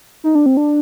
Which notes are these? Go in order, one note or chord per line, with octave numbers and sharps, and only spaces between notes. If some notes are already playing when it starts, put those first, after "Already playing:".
D#4
D4
C4
D4